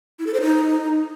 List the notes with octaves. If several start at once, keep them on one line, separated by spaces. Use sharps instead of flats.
E4
A4
C5
D#4